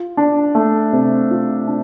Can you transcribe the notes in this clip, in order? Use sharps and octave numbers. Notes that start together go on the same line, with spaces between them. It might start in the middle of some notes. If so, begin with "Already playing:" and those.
Already playing: F4
D4
A3
C3
F4
D4